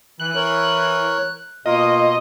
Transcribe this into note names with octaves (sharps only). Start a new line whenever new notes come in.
E3 F#6
A#4 C#5
B2 A#3 F4 D#5